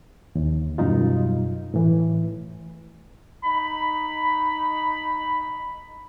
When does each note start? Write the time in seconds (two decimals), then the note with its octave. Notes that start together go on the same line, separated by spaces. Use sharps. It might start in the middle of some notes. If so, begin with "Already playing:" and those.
0.35 D#2
0.78 F#2 B2 G3 D#4 F4
1.74 A2 E3
3.44 D#4 A#5 B5